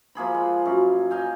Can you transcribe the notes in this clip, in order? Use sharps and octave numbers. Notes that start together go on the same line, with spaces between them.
F3 A#3 G#4 B5
G#3
F#2
D#5 F5 G5 G#5